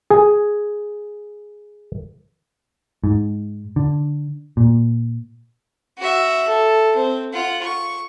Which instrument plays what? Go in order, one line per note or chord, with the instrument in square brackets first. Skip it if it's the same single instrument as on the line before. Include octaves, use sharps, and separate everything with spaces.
[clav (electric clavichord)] G#4 G#5
[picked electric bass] G#2
D3
A#2
[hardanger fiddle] F#4 E5
A4
C4
F4 F#5
C#6